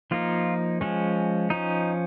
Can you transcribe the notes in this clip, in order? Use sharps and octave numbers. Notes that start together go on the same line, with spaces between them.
F3 A#3 D#4 F4
F3 G#3 C#4
F3 C#4 D#4